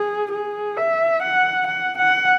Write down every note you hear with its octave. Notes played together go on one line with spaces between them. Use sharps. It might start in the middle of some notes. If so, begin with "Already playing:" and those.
Already playing: G#4
G#4
E5
F#5
F#5
F#5